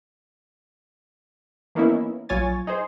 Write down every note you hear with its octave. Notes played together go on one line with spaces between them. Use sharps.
E3 A#3 B3 C#4 D#4 E4
A#1 F#3 F4 C#5 G#5 A6
D#4 G#4 C5